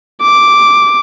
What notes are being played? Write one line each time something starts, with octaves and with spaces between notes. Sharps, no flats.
D6